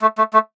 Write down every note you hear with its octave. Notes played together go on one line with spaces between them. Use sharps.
A3
A3
A3